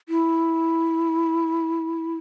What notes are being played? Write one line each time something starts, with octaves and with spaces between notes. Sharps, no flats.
E4